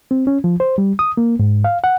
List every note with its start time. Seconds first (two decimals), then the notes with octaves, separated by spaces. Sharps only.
0.11 C4
0.27 C#4
0.44 F3
0.60 C5
0.78 G3
0.99 D#6
1.17 A#3
1.39 G#2
1.64 F5
1.84 F#5